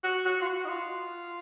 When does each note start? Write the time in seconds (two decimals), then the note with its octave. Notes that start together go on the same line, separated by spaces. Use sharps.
0.04 F#4
0.25 F#4
0.41 F4
0.47 F#4
0.65 D#4
0.68 F4